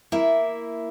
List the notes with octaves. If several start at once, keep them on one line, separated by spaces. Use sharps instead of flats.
A#3 E4 E5